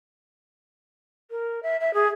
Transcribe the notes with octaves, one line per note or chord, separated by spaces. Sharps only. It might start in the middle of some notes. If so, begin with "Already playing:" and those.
A#4
E5
E5
G#4